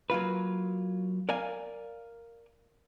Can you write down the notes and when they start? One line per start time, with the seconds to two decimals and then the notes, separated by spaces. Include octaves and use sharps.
0.10 F#3 A#3 F4 B4
1.29 A#4 D5 F5 G#5